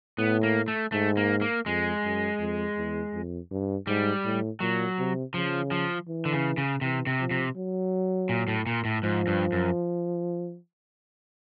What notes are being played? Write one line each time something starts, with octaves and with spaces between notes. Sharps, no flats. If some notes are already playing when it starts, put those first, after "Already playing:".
A2 B3
A#3
A3
G#2 A3
A#3
A#3
F2 G#3
F#2
F2
E2
F2
G2
G#2 G3
A2
A#2 F#3
C3
C#3 F3
F3
E3
D3
C#3
C#3
C3 E3
C3
F3
C3
F#3
A#2
A2
A#2
A2
G#2 F3
G2
F#2